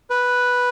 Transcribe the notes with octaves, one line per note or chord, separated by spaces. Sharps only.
B4